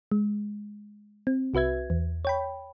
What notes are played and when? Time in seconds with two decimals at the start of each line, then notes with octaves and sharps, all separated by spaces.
0.12 G#3
1.27 C4
1.54 C2 F#4 B4 E5 G#6
1.90 E2
2.25 C#5 G5 B5